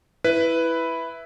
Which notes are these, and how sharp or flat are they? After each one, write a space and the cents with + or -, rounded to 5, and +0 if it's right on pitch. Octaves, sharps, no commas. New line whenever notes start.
E4 +0 B4 +5